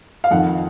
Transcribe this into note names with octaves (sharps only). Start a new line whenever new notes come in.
F5
F2 D#3 F#5